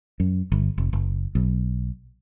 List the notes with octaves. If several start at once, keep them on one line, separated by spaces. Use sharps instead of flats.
F#2
G1
F1
F#1
B1